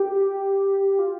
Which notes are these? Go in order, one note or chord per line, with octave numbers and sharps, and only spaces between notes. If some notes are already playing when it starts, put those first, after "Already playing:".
Already playing: G4
F4